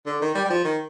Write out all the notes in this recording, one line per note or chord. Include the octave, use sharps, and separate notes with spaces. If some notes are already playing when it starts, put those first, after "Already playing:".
D3
D#3
G3
G3
F3
D#3